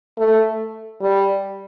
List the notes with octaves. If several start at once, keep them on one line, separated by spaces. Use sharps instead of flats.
A3
G3